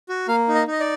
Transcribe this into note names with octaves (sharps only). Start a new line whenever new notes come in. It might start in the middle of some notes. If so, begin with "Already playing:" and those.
F#4
A#3 F5
D#4
D#5
D#4 D#5
D5